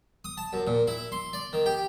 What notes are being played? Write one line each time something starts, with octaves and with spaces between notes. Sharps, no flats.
D#6
A5
F#2
A#2
E4
C6
D5
D#3
G4